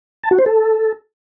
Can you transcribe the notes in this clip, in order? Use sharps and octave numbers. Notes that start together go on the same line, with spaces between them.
A5
F#4
C5
A4